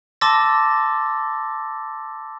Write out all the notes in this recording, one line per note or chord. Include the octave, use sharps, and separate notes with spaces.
A5 C6 D6 E6 A6 A#6